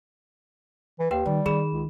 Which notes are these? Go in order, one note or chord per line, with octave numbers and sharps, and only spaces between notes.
E3
D#2 G4 B4 G5
D#3 G3
D#3 G#4 B5 E7
C#2